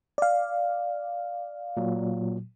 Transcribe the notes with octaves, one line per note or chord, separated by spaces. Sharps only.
D5 F5
A#2 F#3